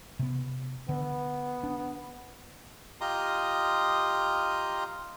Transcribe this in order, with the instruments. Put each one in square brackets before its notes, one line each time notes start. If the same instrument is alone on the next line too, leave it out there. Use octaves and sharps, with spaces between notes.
[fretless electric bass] C3 B3
[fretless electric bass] D3 [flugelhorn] B3
[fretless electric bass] D4
[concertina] F4 G4 D#5 A#5 C6 D#6